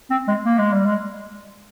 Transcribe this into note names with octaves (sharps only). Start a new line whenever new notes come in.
C4
G#3
A#3
G#3
G3
G#3